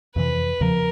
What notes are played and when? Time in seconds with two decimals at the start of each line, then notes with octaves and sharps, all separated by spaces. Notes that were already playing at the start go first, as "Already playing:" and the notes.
0.16 F2 C3 E3 B4
0.60 E2 C#3 F3 A#4